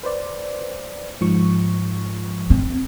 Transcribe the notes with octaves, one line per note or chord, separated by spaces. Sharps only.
B4 C5 D5
G#2 F3 C#6
C4